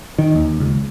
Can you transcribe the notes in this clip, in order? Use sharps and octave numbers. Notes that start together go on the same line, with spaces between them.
D#3
D#2
C#2